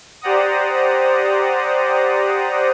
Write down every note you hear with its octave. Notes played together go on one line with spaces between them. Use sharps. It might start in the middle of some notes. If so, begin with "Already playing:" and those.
G4 C5 D5 F#5 A#5 D#6